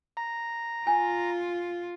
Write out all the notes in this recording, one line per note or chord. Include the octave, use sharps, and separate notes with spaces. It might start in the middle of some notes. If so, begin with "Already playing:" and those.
A#5
F4 G#5